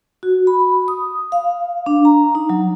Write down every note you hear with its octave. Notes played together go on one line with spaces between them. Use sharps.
F#4
B5
D#6
F5
D4
A#5
D#4
F#3